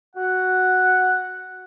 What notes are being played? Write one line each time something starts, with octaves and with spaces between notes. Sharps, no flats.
F#4 F#5